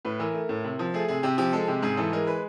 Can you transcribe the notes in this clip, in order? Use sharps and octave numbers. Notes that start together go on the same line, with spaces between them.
A2 B4
E3 A#4
A3
A2
C3
F3
A3 G#4
C3 G#4
C3 G4
F3 G4
G#3 A4
C3 G4
G#2 G#4
E3 A4
G#3 A#4
B4